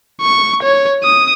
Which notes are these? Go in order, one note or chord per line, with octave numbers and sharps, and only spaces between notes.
C#6
C#5
D#6